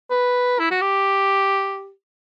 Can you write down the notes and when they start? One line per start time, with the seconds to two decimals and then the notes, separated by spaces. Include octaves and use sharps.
0.10 B4
0.59 E4
0.71 F#4
0.82 G4